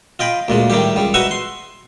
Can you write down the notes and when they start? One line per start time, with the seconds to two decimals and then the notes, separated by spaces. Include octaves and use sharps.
0.19 F4 D#5 G5 B5
0.48 D2 A#2 G#3
0.70 A2 D#3 G3 G4
0.96 C#2 G3
1.14 D#4 F#4 B4 E5 C#6 D#6
1.31 C6